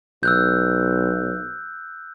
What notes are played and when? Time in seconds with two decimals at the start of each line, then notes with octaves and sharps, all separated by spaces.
0.23 B1 E6 F#6 G6